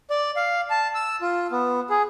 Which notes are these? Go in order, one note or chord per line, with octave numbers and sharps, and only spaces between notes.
D5
F5
A5
E6
F4
B3
G#4